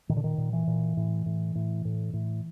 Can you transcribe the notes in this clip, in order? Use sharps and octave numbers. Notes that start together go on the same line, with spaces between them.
A#2 D#3
D3
D#3
A#2
E3
A#2
A2
A2
A2
A2
A2